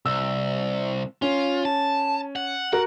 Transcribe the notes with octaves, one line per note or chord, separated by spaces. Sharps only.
C2 E6
C#4 F4
A5
F#5
F#4 A#4 F#5